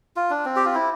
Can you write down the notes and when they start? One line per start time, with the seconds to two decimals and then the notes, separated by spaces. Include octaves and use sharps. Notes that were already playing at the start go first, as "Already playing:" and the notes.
0.16 F4
0.30 D4
0.45 C4
0.56 G4
0.65 F4
0.74 E4